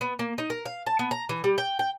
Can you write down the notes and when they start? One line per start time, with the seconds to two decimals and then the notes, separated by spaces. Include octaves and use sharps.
0.01 B3
0.19 A#3
0.38 D#4
0.50 A#4
0.66 F5
0.86 A5
0.99 B3
1.11 A#5
1.29 E3
1.44 G3
1.58 G5
1.79 G5